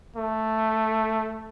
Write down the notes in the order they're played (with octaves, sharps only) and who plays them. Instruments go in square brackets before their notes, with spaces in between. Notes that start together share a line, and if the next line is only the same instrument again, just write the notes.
[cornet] A3